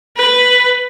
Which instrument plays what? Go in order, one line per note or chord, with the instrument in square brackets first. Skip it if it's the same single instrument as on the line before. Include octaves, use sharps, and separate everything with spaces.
[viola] B4